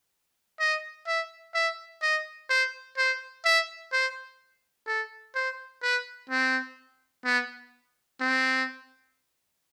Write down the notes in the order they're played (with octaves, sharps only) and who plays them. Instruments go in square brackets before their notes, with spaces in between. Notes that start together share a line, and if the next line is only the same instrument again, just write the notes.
[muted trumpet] D#5
E5
E5
D#5
C5
C5
E5
C5
A4
C5
B4
C4
B3
C4